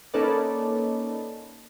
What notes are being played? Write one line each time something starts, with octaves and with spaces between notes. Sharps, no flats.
A#3 C#4 D#4 A4 B4 D5